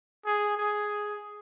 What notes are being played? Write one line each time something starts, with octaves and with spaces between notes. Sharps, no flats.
G#4
G#4